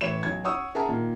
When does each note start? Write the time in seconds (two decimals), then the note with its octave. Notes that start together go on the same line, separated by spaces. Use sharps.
0.01 A2 E3 E4 C#5 E7
0.23 B1 G#6
0.44 C#5 F#5 C#6 D#6 E6
0.75 G#4 A#4 E5 F#5 A5 A#5
0.89 A#2 D#3